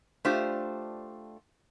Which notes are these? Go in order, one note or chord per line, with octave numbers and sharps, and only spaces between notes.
A3 D4 F4 G4 C5